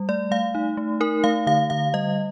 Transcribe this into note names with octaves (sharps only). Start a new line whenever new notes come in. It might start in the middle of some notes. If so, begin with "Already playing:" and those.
Already playing: G3
A3 D5
A3 F5
D#4
A3
D#4 A#4
A3 F5
D3 F5
D3 F5
G3 D#5